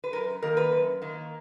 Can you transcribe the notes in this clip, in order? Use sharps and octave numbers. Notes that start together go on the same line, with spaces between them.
B4
F#2 A#4
D#3 A#3 A#4
B4
F#2
D#3 A#3